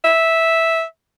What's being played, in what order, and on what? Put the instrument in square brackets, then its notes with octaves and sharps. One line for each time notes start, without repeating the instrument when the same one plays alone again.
[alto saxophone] E5